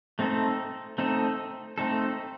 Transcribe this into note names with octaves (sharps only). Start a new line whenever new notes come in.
A3 C4 D#4 A4
A3 C4 D#4 A4
A3 C4 D#4 A4